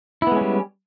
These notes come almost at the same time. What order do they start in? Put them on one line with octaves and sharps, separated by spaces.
E4 B3 G#3 C#4 G3